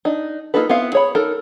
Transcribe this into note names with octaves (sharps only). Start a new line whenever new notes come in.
D4 D#4
A#3 D#4 F4 A4 B4
B3 C4 E4 F5
G#4 C#5 B5
D#4 A4 A#4